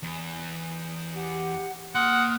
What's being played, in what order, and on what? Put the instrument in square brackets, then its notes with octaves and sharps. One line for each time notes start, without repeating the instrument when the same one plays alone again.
[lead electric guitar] E2
[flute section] G4 F#5
[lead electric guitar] A#3 C6 [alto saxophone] F#5 [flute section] D#6 F6